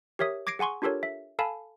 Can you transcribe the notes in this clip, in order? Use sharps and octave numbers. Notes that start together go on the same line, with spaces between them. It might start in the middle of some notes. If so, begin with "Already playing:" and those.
G4 A#4 C#5 E5 D#6
D6 G#6 A#6 C7 D7
G#4 F#5 G#5 C6 C#6
D4 F4 G4 A4 A#4 C#5
E5
A4 F5 G#5 A5 B5